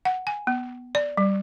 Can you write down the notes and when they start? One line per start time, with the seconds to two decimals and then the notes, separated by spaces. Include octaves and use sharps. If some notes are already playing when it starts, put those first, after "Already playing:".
0.05 F#5
0.27 G#5
0.47 B3
0.95 D5
1.17 G3